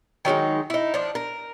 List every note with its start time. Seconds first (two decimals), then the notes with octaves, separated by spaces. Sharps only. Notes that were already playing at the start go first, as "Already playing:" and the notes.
0.25 D#3 F#3 G#3 D#4
0.70 D#4 E4
0.94 F3 D4
1.15 A#4